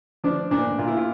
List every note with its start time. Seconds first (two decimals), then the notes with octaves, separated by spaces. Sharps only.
0.24 F3 D4
0.51 A#2 D4
0.78 A#2 F4
0.88 E4
0.97 F4